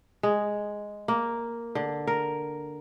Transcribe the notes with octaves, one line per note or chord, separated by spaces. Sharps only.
G#3
A#3
D3
A#4